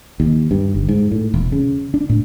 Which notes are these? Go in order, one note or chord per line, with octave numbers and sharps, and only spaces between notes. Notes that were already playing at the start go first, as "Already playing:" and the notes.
D#2
G2
G1
G#2
A2
E1
C#3
D4
A2